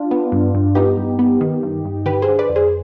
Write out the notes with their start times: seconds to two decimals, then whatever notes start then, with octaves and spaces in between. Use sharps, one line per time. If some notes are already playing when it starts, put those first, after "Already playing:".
Already playing: D4 F4
0.11 B3
0.32 G2
0.55 G2
0.75 B3 D#4 G4
0.97 G2
1.19 B3
1.41 D#3
1.63 G2
1.85 G2
2.06 D3 G4 B4
2.22 G#4 C5
2.28 D3
2.39 B4 D5
2.49 F2
2.56 G#4 C5